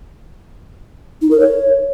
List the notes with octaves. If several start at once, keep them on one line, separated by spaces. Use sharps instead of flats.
D#4
A#4
C#5